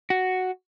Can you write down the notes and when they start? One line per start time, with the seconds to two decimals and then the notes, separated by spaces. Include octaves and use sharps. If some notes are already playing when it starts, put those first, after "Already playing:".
0.10 F#4